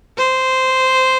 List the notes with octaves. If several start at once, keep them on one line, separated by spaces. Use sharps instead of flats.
C5